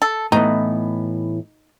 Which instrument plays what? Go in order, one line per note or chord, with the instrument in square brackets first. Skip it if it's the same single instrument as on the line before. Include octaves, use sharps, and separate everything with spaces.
[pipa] A4
[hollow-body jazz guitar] A2 E3 B3 [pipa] D#4